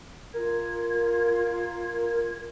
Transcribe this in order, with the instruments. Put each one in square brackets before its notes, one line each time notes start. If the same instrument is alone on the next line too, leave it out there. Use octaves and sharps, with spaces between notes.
[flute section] F4 G#6 [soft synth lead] A#4